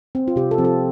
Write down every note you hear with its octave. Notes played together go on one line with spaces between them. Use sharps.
C4
F4
C3 G4
A4
F3 C4
A4